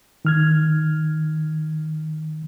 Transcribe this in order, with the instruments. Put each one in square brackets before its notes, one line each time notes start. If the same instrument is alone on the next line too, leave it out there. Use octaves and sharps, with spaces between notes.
[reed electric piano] D#3 F6 G#6